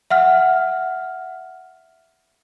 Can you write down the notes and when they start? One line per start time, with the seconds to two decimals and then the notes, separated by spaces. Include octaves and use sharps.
0.10 E5 F#5 F6